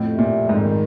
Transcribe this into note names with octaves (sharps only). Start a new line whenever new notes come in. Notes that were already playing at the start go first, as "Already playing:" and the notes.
Already playing: F2 A2
C3
A#2
F2
G#2
D#3